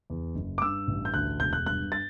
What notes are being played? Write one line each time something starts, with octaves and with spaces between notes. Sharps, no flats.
E2
F#1
D6
G2 E6
A1
G6
D2 F#6
E1 G6
F#6
G2 F#6
A6